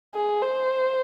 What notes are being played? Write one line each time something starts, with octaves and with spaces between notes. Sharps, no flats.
G#4
C5